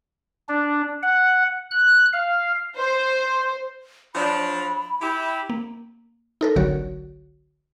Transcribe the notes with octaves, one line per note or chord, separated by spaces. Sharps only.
D4
F#5
F#6
F5
C5
F3 F#3 D4 B5
E4 G4
A#3
D#4 A4 A#4
G1 C2 D3 F#3 F#4 C#5